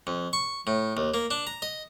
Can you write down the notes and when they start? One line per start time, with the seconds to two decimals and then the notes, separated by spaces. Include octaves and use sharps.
0.07 F2
0.33 C#6
0.67 A2
0.97 D#2
1.14 A#3
1.31 D4
1.47 A#5
1.62 D#5